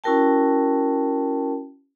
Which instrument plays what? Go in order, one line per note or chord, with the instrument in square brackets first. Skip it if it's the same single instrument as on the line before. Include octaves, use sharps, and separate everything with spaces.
[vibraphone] C#4 E4 F#4 A#4 G5 A5